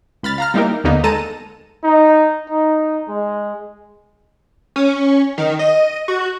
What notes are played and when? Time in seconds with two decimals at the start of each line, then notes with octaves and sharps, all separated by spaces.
0.23 C#2 B5 F6 A6
0.38 F5 A#5 F6
0.54 G3 A#3 D#4 E4 G4 A#4
0.84 D#2 D3 A#3 B3 D#4
1.04 G#3 A4 A5 A#5 D#7
1.83 D#4
2.50 D#4
3.08 G#3
4.76 C#4
5.38 D#3
5.59 D#5
6.08 F#4